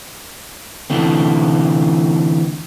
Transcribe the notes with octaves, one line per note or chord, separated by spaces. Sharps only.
D3 E3 A3 C4